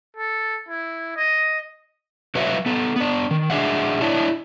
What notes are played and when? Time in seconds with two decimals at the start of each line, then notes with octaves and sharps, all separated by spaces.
0.17 A4
0.69 E4
1.17 D#5
2.35 F#3 F#4 B4 C#5 E5 F5
2.66 B3 A4
2.96 B3 D4
3.31 D#3
3.50 D4 G#4 E5 F#5
4.01 D4 E4 C#5